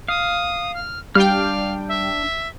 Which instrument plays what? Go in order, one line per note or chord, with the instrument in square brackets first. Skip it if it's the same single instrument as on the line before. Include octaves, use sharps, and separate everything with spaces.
[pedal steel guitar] F5 [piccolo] D#6
[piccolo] F6
[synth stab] G3 G5 [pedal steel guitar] D4 F6 [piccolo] F5
[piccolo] E5